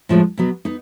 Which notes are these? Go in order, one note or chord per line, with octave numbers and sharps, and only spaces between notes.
A2 F3 G#3
B2 F#3 B3
B3 D#4